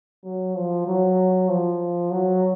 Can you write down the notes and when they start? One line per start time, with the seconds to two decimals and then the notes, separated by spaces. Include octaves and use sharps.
0.24 F#3
0.56 F3
0.87 F#3
1.49 F3
2.11 F#3